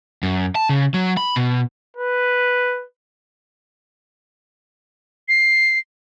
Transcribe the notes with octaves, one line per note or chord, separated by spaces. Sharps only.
F#2
A5
C#3
F#3
B5
B2
B4
C7